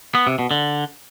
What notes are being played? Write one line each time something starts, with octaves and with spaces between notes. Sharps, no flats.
B3
C3
B2
D3